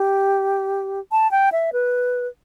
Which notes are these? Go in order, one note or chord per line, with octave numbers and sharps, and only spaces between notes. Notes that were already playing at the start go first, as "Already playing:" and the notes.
Already playing: G4
A5
G5
E5
B4